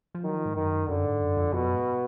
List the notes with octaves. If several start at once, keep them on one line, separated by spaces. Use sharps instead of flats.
F3
D#3 F#3
F3
G#2
F#2 D#3
F#2 D3
G#2
F#2
F2
F2 B2
F#2
G#2